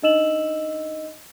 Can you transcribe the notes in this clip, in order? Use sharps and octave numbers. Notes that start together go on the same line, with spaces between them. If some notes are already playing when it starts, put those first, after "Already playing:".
D4 D#4 D#5 E6 E7 F#7